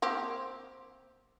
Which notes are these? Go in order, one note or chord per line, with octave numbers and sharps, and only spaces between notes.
A#3 C4 G4